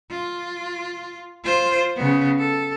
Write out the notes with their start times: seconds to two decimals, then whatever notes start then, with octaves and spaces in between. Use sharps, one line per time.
0.10 F4
1.44 F4 C5
1.96 C#3 B3
2.39 A4